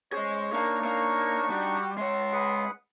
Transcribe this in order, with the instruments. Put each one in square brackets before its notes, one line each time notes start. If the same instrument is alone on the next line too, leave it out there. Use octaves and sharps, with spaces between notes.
[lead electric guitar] G#3 G#4 [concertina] C#4 C5 [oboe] C#5
[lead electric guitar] A#3 [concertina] D4 D#4 C#6
[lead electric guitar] A#3
[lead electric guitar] G3 [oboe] F#4
[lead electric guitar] G#3 C#5 [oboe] C6
[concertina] G#4 B4 F#5